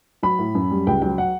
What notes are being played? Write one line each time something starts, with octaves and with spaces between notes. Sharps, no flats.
F#3 B5
A2
F#2
G3
C#2 G5
F#3 G5
F#5